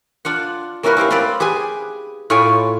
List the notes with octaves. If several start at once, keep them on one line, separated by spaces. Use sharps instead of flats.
D4 F4 F#5
A#3 C#4 E4 F#4 A#4 B4
E4 G4 C5 F5
C4 B4 C5 D5 F5 B5
G4 G#4 B4 G#5
A2 F4 C#5 F5 G5 G#5